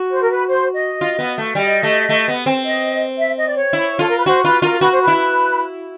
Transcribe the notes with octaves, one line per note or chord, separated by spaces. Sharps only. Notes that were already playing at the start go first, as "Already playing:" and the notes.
Already playing: F#4
C5
A#4
B4
C5
D#5
F4
B3
A3
G3 D#5
A3
A3
B3
C4
D#5
E5
D#5
D5
C#5
E4
F4 A4
A#4
B4
F#4 C5
F4 B4
F4 A#4
F#4 B4
C5
B4
E4